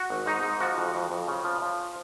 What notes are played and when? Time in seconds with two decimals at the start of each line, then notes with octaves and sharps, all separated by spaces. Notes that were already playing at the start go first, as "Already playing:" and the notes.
Already playing: F#4
0.10 G#1
0.26 G#2 D#4
0.43 G#2
0.60 F3 F#4
0.78 F2
0.95 F2
1.11 F2
1.28 C#3
1.44 F3
1.62 F3